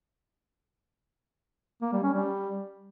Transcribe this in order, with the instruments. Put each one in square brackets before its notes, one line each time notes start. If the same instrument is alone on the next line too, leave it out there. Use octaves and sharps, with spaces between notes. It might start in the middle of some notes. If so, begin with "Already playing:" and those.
[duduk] A#3
G3
C#4
G3